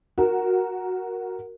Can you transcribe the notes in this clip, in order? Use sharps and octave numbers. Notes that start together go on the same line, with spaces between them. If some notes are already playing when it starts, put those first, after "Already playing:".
F#4 A#4